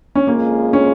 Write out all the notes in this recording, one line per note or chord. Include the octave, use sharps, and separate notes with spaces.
C#4
F2 C#3 G#3 A#3 F4 G#4
C#4